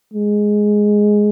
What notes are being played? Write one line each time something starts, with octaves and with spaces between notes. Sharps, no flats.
G#3